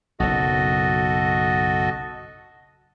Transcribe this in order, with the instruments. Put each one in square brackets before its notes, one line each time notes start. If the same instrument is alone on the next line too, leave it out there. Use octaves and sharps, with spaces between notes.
[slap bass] F#1 B1 [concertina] F#4 A4 D#5